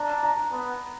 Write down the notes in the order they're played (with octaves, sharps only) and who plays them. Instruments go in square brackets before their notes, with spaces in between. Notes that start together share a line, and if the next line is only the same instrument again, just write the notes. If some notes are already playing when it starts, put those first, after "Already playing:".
Already playing: [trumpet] D4 [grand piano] A#5
[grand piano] A#5
[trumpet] B3